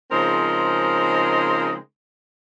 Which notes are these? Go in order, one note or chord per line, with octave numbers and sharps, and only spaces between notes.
C#3 F3 G#3 C4 D#4 A#4